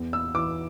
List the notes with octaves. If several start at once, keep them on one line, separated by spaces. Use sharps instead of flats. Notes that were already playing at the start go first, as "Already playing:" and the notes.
Already playing: E2
E6
E3 D6